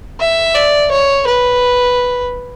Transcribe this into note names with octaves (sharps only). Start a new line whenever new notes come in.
E5
D5
C#5
B4